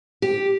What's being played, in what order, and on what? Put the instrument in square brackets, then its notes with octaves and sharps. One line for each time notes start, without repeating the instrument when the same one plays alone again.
[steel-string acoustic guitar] G4